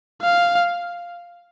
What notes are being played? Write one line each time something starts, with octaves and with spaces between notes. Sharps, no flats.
F5